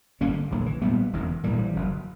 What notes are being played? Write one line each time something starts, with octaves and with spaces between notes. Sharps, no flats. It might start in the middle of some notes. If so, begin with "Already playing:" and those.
G1 G2 D3 A#3 C#4
A#1 A#2 D3 F#3
E3
A#1 A#2 G3 B3
E1 E2 C#3
A#1 A#2 E3 G3
F#1 F#2 C#3